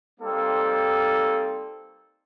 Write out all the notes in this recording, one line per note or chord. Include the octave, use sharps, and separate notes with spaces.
G3 A#3 C4 D#4 A4